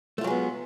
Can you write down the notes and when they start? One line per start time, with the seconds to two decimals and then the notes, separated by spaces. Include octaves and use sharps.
0.18 A3
0.21 F4
0.24 F#3
0.27 G#3
0.30 B3